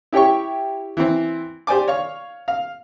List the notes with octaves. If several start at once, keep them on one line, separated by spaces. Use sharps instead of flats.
E4 G4 C#5 G5 C#6
E3 C4
G4 C5 D5 G#5 D6
C#5 F5 C#6
F5